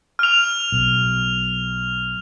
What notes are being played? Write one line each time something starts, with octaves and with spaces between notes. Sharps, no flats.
F6 F7
B1